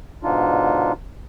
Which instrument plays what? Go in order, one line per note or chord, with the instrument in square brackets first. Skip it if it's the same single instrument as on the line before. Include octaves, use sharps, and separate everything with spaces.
[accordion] G#2 B2 D3 D4 D#4 F4